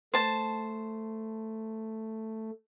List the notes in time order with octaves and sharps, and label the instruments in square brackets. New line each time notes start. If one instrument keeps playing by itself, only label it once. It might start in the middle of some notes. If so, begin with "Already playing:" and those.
[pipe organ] A3 [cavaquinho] C5 A5